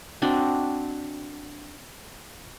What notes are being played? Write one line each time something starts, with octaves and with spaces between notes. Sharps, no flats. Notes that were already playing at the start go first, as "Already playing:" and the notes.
C4 D4 F#4 D#5